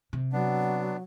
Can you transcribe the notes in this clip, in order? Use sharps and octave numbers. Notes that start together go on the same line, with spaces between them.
C3
F#3 B3 D4